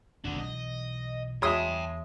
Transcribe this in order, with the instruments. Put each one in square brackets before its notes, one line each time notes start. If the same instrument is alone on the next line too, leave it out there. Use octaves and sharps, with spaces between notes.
[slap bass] E1 C3 [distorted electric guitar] D4 F#4
[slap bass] B1 E3 [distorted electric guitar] D#5
[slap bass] E2 [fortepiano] G#3 C6 D#6 [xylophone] C#5 E5 [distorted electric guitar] G5 A5